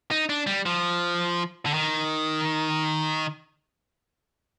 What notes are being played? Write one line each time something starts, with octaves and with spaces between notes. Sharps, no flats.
D#4
D4
G3
F3
D3
D#3